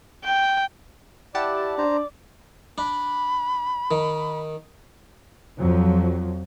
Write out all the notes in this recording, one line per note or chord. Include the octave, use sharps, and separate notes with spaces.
G5
E4 G4 D5 F#5 A5
D4 C5 A#5
D4 B5
D#3
F2 F3 F#3